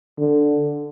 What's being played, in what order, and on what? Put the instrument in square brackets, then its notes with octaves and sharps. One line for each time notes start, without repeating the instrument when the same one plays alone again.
[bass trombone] D3